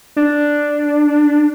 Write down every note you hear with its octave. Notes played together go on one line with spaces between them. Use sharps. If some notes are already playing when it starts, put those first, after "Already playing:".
D4